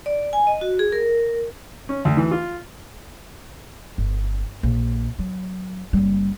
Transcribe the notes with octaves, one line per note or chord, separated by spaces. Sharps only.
D5
G#5
D#5
F#4
G#4
A#4
C#4
D2
E3
F4
G1
A#1
F#3
F#1 G3